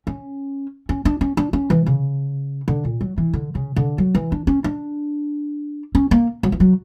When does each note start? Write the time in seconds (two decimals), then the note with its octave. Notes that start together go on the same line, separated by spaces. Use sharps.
0.07 C#4
0.89 C#4
1.05 D4
1.21 C#4
1.37 D4
1.53 C#4
1.70 E3
1.86 C#3
2.68 D3
2.85 A#2
3.01 F#3
3.18 E3
3.33 D3
3.55 C#3
3.76 D3
3.98 F#3
4.15 E3
4.32 D4
4.47 C#4
4.64 D4
5.95 C#4
6.11 A#3
6.43 F#3
6.52 E3
6.60 F#3